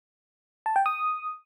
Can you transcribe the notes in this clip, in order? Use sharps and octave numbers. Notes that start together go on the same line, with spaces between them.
A5
G5
D#6